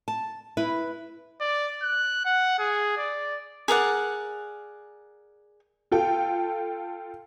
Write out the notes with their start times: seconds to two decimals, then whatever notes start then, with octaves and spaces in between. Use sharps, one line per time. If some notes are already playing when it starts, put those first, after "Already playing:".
0.08 A5
0.57 E4 B4
1.41 D5
1.83 F#6
2.25 F#5
2.59 G#4
2.97 D5
3.68 G#4 A#4 D5 F#5
5.92 F4 A4 G5